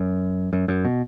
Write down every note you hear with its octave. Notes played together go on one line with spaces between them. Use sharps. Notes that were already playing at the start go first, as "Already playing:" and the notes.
Already playing: F#2
F#2
F#2
B2